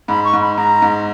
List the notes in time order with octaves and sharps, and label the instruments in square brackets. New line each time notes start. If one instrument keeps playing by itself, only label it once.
[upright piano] G#2 [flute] B5
[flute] C#6
[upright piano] G#2
[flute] B5
[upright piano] G#2 [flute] A#5
[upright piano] G#2